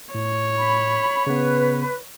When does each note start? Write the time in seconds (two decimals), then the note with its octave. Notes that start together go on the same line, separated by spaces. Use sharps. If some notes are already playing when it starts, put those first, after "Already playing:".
0.14 A2 C#5
0.58 B5
1.27 C#3 B3 B4